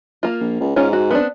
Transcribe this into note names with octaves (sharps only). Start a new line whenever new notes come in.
A#3 F4
A#1
C#2
G#2 C#4 F4
F#4
B3 C4 D4